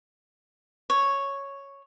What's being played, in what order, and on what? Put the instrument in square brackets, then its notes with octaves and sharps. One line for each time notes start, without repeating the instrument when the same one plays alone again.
[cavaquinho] C#5